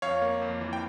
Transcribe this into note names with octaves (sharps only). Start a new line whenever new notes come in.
F2 C#5 F5
A#3
F2
E3
G5